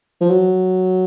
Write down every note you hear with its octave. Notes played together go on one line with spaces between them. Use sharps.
F3
F#3